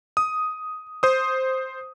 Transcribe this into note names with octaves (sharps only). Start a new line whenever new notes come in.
D#6
C5 D#6